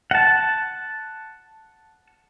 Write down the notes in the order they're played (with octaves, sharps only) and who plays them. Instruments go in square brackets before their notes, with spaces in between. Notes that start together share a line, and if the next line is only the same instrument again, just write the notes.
[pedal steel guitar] F#5 A5